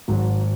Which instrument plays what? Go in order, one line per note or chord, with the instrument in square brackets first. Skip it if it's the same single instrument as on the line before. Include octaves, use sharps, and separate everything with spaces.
[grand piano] G#1 G#2 F#3